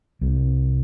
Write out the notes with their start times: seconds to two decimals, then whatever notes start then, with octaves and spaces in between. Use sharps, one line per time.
0.21 C2 C3 G3